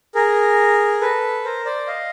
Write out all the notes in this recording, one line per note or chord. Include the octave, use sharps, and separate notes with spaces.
G#4 A#4
A4 B4
A#4 C5
C5 D5
D#5 F5